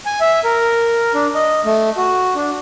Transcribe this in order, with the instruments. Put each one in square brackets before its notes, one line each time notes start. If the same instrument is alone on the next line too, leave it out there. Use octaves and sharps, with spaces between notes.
[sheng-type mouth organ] G#5
E5
A#4
D4
D#5
A3
F#4
D4